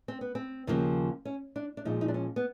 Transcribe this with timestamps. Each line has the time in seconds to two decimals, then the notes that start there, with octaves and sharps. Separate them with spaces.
0.08 C4
0.21 B3
0.35 C4
0.67 D#2 C#3 F3 A#3
1.25 C#4
1.56 D4
1.77 D4
1.85 A#2 F3 G#3 D#4
2.01 D#4
2.08 D4
2.14 C#4
2.36 B3